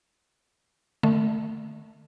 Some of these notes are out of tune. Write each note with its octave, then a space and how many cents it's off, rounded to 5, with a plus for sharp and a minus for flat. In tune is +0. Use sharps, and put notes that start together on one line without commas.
D3 +45 A3 +0